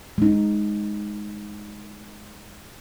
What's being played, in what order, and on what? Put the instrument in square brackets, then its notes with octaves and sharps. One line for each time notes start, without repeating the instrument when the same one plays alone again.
[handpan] G#3 D#4